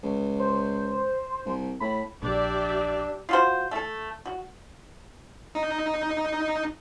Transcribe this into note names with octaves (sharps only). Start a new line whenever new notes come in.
C#2
C5
C2
A2 B5
A#1 D4 G4 D5 E5
F4 F#4 C5
A3 A4
F#4
D#4